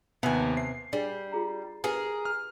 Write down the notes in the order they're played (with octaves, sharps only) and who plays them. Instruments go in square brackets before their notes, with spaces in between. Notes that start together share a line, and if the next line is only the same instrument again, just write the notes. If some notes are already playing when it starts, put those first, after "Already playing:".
[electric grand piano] D#2 B3 [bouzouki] C3 G#5 [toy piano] E5 F#5 A5
[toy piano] B4 E5 [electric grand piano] C7
[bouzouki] G3 [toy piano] D4 G#4
[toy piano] F4 G#4 A#5
[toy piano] G4 B4 [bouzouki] G#4 A#4
[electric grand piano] F6